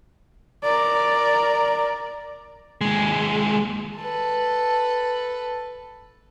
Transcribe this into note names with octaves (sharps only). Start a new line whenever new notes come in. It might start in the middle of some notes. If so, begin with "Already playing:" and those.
A#4 D5
D#2 G#3
A4 B4